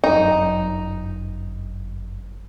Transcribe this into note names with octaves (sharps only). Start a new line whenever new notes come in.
G1 F#2 D#4